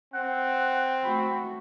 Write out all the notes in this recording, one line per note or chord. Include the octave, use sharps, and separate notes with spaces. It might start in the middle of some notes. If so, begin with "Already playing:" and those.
C4 F#5
A3 F#4 B5